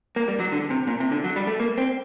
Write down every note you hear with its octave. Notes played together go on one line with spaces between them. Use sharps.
A#3
G3
F#3
D3
C3
A#2
C3
D3
F#3
G3
A3
A#3
C4